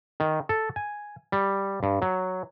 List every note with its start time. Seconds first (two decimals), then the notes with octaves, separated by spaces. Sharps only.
0.20 D#3
0.49 A4
0.76 G#5
1.32 G3
1.83 G2
2.02 F#3